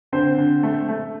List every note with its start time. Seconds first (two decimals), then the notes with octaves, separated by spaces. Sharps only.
0.12 D3 C4 C5
0.38 D3
0.63 A3
0.89 A3